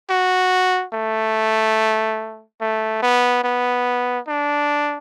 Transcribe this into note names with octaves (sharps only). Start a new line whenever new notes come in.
F#4
A3
A3
B3
B3
D4